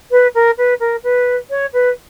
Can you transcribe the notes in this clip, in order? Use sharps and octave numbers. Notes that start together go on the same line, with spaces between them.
B4
A#4
B4
A#4
B4
C#5
B4